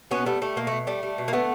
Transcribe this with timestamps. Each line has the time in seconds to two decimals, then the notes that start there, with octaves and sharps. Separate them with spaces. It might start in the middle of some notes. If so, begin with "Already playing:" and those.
0.11 B2 B3 C#4
0.26 G3 A3 B3
0.41 G3 A3
0.56 B2 A#3
0.67 B2 A3
0.87 G3 A3
1.03 G3
1.18 B2
1.28 A#3
1.33 D3 A3 B3